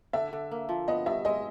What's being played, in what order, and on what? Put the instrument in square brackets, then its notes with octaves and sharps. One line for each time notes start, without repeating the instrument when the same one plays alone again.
[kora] D3 [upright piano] E5
[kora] D3
A#3
F3
[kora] B3 [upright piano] D#5
[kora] G2 [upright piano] E5
[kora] G#3 [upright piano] D#5